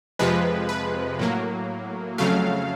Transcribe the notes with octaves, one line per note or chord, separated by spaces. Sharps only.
F2 C3 F3 G#3 B4
B4
A2 F#3 A#3
F2 C#3 F#3 A3 F5